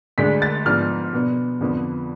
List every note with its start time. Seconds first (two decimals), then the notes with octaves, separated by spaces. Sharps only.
0.18 D2 D3 G#3 D4 B6
0.42 A6
0.65 G#2 F3 B3 D4 F6
1.13 B2 B3 D4
1.61 F2 D3 F3 B3